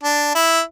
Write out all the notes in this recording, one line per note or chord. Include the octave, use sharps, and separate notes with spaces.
D4
E4